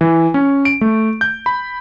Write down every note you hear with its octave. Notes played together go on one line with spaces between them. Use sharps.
E3
C#4
D7
A3
G6
B5